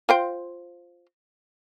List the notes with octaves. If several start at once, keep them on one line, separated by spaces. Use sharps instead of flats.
F4 C5 G5